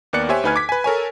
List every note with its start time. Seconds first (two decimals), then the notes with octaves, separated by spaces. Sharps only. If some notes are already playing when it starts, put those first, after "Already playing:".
0.13 D#2 B3 A#4 D5 F#6 C#7
0.29 G4 C5 C#5 E5 G#5
0.44 D2 D#4 B4 G#5 F6 G#6
0.56 D6 G#6 B6
0.69 B4 G#5
0.84 A4 A#4 C#5 G#5